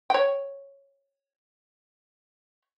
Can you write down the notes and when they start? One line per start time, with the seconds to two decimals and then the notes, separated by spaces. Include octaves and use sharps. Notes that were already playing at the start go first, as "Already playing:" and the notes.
0.10 C#5 G5